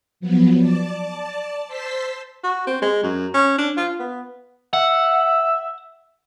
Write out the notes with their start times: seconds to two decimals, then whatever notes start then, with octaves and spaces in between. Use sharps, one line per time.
0.20 F3 F#3 B3
0.59 D5 A5
1.67 C5 A5 C6 E6 B6
2.43 F#4
2.67 C4
2.82 G#3
3.03 F#2
3.34 C#4
3.58 D4
3.77 F4
3.99 B3
4.73 E5 F#5